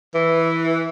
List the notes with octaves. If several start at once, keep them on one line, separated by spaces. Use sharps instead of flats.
E3